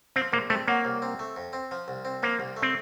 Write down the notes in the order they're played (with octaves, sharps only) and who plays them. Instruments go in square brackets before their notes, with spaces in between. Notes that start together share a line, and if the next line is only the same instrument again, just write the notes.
[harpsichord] F3 [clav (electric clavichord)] C4
[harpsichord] A#1 [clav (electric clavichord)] A#3
[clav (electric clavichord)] A3 [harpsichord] C4
[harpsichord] F#3 [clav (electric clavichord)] A#3
[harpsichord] C2
C4
A3
F2
C4
F3
C2
C4
[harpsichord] F3 [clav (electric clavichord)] A#3
[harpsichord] C2
A3
[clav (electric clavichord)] C4